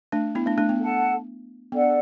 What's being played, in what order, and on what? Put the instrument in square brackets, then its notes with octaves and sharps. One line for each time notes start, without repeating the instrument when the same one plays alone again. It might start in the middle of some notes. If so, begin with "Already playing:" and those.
[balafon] A3 D4
B3 E4
A3 D4
A3 D4
B3
[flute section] A4 F#5 A5
[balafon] B3 [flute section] D4 A4 D5 F#5